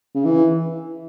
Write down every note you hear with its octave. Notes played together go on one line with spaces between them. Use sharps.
C#3
E3